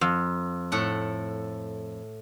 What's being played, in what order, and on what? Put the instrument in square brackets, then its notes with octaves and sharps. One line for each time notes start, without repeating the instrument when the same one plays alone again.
[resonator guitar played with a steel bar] F2
[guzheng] A2 A4 F#5